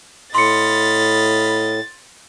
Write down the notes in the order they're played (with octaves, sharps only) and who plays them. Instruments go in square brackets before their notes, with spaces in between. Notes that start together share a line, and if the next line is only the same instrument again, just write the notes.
[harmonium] A2 [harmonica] D#5 F5 B5 [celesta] C6 C#7 [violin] A6